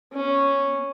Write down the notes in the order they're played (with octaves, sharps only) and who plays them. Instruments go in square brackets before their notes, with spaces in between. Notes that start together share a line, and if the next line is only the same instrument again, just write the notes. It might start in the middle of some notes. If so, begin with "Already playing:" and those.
[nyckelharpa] C#4